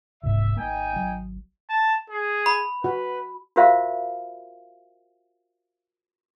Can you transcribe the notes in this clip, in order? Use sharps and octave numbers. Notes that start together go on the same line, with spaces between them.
D#1 C2 G#2 E5
G#1 A#3 D#4 G5 G#5
G#1 F#3
A5
G#4
B5
F#4 B4
F4 F#4 A#4 C5 E5 F5